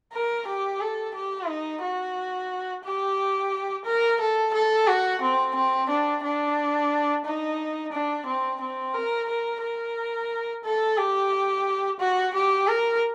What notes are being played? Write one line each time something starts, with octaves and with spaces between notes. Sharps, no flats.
A#4
G4
A4
G4
D#4
F#4
G4
A#4
A4
A4
F#4
C4
C4
D4
D4
D#4
D4
C4
C4
A#4
A#4
A#4
A4
G4
F#4
G4
A#4